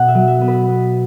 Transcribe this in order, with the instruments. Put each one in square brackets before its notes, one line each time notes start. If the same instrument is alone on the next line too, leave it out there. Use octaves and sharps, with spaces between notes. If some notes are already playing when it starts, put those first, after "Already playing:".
Already playing: [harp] B2 B3 F#5
E5
F#3
E5
B3
B4
B3